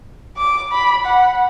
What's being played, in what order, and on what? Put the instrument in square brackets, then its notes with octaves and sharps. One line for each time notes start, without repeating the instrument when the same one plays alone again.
[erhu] D6
B5
F#5